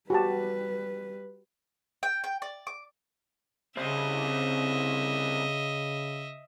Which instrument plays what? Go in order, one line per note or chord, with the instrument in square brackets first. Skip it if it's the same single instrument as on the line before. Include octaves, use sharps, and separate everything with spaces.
[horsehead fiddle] G3 B4 [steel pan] F#4 G4 A5
[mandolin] G5
G5
D5
D6
[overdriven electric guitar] C2 C4 [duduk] C#3 [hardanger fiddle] D#5 E5